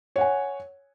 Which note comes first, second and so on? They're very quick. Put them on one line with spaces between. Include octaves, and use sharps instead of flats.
C#5 F#5 G#5